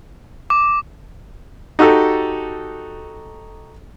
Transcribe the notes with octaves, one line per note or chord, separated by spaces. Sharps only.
D6
D#4 F#4 G4 A4